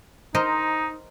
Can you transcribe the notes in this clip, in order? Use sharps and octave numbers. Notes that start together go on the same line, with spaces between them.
D#4 A#4 C5 D#5